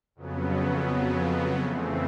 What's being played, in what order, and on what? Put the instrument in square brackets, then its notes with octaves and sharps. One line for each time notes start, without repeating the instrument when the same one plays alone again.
[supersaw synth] F2 C#3 F#3 B3
F2 C#3 E3 A3 C4